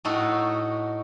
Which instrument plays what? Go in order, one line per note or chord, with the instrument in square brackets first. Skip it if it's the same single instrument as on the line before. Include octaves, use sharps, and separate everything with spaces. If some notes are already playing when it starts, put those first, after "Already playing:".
[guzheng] A2 A3 D#4 F#4 A4